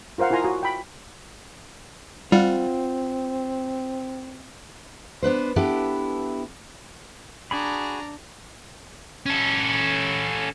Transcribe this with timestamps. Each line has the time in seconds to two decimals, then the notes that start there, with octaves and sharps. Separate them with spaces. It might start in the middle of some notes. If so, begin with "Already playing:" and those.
0.18 F4 A#4 C5 F5 F#5
0.30 E4 F4 A#4 G#5 A#5 C6
0.43 F#4 G#5
0.63 G5 B5
2.32 G3 C4 F4 F#5
5.23 B3 D4 B4 C5
5.56 B3 D4 E4 G4 A4 B4
7.51 D4 F#4 G#4 A#5 B5
9.26 C#4 A4